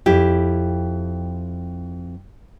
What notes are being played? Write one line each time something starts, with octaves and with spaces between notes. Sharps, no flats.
F2 E4 G4